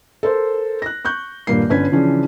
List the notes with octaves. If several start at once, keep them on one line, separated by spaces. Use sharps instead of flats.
A4 A#4 C5 C6
F#6 A#6
C#6 F#6 G6
D#1 G2 A#3 C7
G1 D3 C#4 B4 G#6 B6
C#3 E3 F3 C#4 D4 G#4